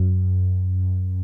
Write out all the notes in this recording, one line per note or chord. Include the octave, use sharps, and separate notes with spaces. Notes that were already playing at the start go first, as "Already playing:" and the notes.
Already playing: F#2